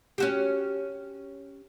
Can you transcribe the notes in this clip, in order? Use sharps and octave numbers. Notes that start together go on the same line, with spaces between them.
C#4 F#4 G4